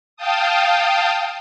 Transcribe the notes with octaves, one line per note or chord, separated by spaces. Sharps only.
F5 G5 A5 D#6